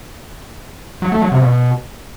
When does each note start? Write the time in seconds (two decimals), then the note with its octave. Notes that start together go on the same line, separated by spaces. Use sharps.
1.02 F#3
1.12 A3
1.22 F#3
1.32 C3
1.42 B2